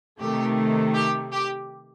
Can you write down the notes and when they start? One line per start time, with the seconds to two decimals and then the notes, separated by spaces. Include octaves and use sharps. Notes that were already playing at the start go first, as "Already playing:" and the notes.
0.21 C3 D#3 A3 G4
0.95 G4
1.33 G4